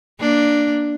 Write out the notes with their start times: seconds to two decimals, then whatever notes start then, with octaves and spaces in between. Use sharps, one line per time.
0.20 A#3 D4